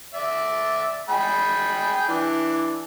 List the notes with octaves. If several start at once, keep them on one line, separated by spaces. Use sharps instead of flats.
D5 E5
G#4 G5 B5
E3 D4